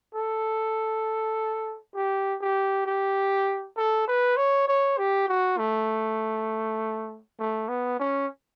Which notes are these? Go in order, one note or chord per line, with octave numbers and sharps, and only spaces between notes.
A4
G4
G4
G4
A4
B4
C#5
C#5
G4
F#4
A3
A3
B3
C#4